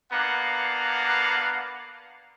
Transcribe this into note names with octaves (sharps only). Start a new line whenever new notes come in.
A#3 B3 D4 F5 F#5 A#5